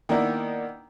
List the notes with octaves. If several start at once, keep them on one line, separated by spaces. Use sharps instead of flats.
D#3 A#3 B3 D4 E4